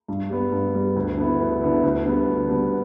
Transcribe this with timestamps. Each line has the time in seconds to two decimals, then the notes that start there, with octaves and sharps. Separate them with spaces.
0.08 G2
0.30 G3 B3
0.52 G2
0.74 G3 B3
0.96 D2
1.17 D3 B3 E4
1.40 D2
1.61 D3 B3 E4
1.83 D2
2.05 D3 G3 B3
2.28 D2
2.50 D3 G3 B3